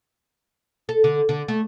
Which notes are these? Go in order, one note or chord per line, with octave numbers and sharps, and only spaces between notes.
A4
D3
D3
A3